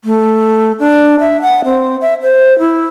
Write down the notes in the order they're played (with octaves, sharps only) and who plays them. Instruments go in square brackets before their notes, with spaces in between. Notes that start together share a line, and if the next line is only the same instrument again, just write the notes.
[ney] A3
D4
E5
F#5
C4
E5
C5
E4